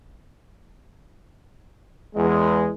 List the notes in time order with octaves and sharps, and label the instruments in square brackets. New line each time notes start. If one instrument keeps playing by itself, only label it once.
[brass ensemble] E2 G#3